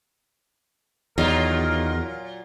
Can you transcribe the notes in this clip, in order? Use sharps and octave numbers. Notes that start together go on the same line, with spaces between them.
E2 A#2 D#3 F#3 F4 A#4